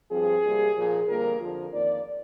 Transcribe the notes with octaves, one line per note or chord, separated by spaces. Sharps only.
G2 F3 C4 G#4
C3 G3 A#3
A#2 F3 A#3
F2 D3 G3 A#3 A#4
F2 D3 F3
F2 D#3 A#3 D5